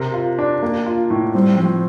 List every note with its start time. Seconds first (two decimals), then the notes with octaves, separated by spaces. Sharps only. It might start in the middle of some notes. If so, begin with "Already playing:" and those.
Already playing: C3 A#4
0.14 F4
0.39 D4
0.63 A#3
0.86 F4
1.10 A2
1.34 G3 C4
1.58 F3 C4